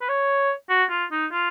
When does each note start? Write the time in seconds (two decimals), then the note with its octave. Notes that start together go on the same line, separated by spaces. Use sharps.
0.01 B4
0.09 C#5
0.70 F#4
0.90 F4
1.12 D#4
1.32 F4